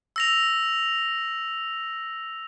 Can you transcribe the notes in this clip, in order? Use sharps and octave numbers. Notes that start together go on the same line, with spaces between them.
E6 A#6 F7